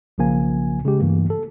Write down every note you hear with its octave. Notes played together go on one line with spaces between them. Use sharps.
B1 C#3 F3 A#3 G#5
C#3 G#3 G4
G2 E3 A3 A#3
A4